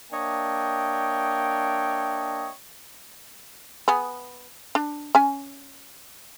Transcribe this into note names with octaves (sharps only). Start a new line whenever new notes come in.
A#3 D4 C#5 D#5 E5 G5
B3 G#4
D4
C#4 G#5